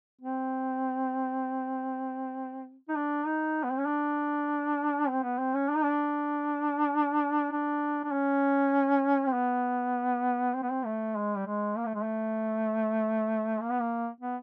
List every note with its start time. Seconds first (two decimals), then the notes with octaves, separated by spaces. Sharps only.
0.22 C4
2.89 D#4
2.96 D4
3.26 D#4
3.64 B3
3.71 C4
3.79 C#4
3.86 D4
5.09 C4
5.23 B3
5.39 C4
5.54 C#4
5.69 D4
5.76 D#4
5.84 D4
7.52 D4
8.04 D4
8.12 C#4
9.27 C4
9.33 B3
10.55 C4
10.63 B3
10.70 C4
10.85 A3
11.16 G#3
11.36 G3
11.47 G#3
11.77 A#3
11.86 A3
11.95 G#3
12.03 A3
13.60 A#3
13.70 B3
13.80 A#3
14.20 B3